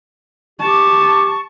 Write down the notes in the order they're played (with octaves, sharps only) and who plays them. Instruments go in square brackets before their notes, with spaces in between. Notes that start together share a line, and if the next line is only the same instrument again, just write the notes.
[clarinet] G4 [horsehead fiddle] A5 [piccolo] C#6